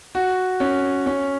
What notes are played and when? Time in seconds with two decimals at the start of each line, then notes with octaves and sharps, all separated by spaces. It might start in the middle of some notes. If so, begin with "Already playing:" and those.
0.15 F#4
0.60 C#4
1.06 C#4